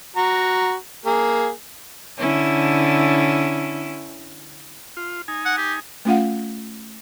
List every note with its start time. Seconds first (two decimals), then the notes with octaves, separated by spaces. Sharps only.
0.16 F#4 A#5
1.06 A#3 G#4
2.18 D3 C#4 E4
4.97 F4
5.28 D#4 G#5
5.45 F#5
5.58 G4
6.05 A3 C#4 F4 F5 F#5